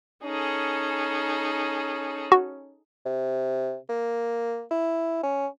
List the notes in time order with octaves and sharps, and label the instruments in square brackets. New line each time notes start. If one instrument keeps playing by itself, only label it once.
[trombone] C#4 [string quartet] D#4 G#4 A4
[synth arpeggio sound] F#4
[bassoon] C3
A#3
E4
C#4